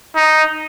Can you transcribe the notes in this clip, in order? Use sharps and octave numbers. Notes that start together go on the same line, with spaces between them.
D#4